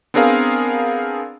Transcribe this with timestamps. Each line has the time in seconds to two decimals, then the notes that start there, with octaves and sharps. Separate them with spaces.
0.14 B3 C4 D4 G#4 A#4 F5